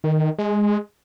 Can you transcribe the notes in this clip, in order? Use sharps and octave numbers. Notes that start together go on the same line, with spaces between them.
D#3
G#3